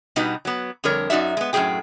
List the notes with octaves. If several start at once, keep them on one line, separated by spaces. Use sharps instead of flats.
B2 G3 B3 D#4 F#4
F#3 B3
F2 D3 G3 A#4 C#5
F#2 D#4 F#4 D5 E5
G#3 B3
F#2 A2 F#3 C4 G#4 G5